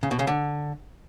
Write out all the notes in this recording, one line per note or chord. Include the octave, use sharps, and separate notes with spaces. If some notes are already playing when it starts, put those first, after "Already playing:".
C#3
B2
C#3
D3